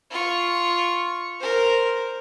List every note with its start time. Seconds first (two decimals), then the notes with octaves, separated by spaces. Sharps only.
0.11 F4 C#6
1.40 A#4 C5